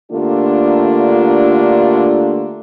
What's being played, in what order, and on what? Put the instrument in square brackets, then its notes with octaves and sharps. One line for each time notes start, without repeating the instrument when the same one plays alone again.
[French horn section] D3 A3 A#3 D4 F4 G4